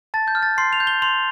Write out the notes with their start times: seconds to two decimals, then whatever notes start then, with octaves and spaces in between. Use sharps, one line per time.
0.14 A5 A6
0.28 G6
0.35 F6
0.43 A6
0.58 C6 C7
0.73 F7
0.80 G6
0.87 G7
1.02 C6 F7